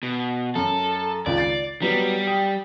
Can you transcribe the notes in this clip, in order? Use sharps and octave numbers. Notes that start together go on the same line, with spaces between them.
B2
F#2 A4
G#1 C#2 D5
A6 C7
F#3 G3 B3
G4 D#6